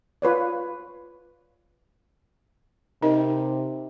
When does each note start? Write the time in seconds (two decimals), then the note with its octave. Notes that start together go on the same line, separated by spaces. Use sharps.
0.22 F4 B4 C#5 D5
3.03 C3 D#4 A#4 D#5